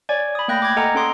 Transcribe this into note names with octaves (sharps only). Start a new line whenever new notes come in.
C#5 D5 G#5 G#6
B5 D#6
A3 A#3 G5 F#6 G6 A#6
D6 G#6
A4 D#5 F#5 G#5 A#5 F6
C#4 A4 C6 D#6